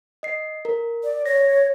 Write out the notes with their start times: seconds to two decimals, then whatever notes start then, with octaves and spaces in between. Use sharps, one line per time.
0.23 D#5 C7
0.65 A#4
1.04 D5
1.26 C#5 A#6